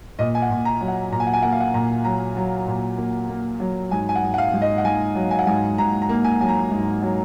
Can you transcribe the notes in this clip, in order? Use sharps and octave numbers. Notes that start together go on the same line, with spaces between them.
A#2 D#5
G#5
F#5
A#2
A#5
F#3
F#5
A#2 A#5
G#5
F#5
G#5
A#3 F#5
F5
F#5
A#2 A#5
F#3 A#5
F#3
A#2
A#3
A#3
F#3
G#2 G#5
G#5
F#5
G#2
F#5
F5
G#2
D#5
F#5
G#2 G#5
F#3
G#5
F#5
G#2 G#5
G#2 A#5
A#5
A#3
G#5
F#3 G#5
A#5
G#2
F#3